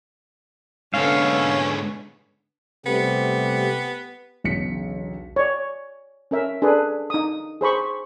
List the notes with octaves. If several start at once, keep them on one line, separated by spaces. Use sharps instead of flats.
G#2 D3 B3 C#4 A4 F5
C3 G3 A3 B3 G4
E1 B1 C#3 B6 C#7
C#5 D5
C#4 A#4 E5
D4 G#4 A4 B4 D5
D#4 D#6
G#4 C5 B5 C#6